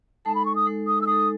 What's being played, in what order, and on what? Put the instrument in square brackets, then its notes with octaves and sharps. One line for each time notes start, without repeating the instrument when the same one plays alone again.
[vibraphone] G#3 D#4 A4 [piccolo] A5
[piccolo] B5
C#6
D#6
[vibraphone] G#3 D#4 A4
[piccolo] D#6
E6
[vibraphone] G#3 D#4 A4 [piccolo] D#6